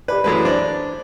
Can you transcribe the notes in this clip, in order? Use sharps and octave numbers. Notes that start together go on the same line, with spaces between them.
G4 B4 D5
F#2 E3 G#3 A3 B4
D4 C5